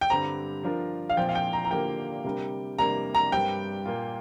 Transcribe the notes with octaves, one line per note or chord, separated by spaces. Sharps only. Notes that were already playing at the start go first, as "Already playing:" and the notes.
G5
G2 D3 G3 C4 G4 A#5
F3 D4 F4 A#4
F5
A#2 F3 C4 G5
F5
G5
A#5
A#5
D3 F3 A#3 G4 A#4 G5
C3 G3 D4 A#4
C3 G3 A#3 D4 A#4 A#5
A#5
G2 G3 C4 A#4 G5
A#2 A#3 F4